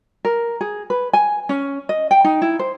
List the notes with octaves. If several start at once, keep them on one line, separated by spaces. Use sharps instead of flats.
A#4
G#4
B4
G#5
C#4
D#5
G5
D#4
E4
C5